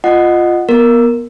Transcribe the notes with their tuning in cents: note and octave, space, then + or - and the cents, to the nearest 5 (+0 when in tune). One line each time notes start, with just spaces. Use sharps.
F4 +0 D#5 -10 F#5 -5
B3 -25 A#4 +0